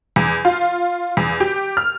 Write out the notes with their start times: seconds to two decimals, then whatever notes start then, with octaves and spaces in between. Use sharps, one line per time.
0.16 E2
0.45 F4
1.17 E2
1.40 G4
1.77 F6